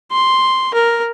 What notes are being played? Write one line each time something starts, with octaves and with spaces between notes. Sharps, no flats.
C6
A#4